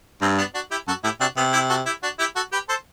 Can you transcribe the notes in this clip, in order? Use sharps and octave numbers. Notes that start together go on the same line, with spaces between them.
G2 C4
B3 D4
D4 F#4
E4 G4
F#2 F#4 A4
A2 E4 G4
C3 D4 F#4
C3 B3
E4 G4
F#4 A4
E4 G4
D4 F#4
E4 G4
F#4 A4
G4 B4
A4 C5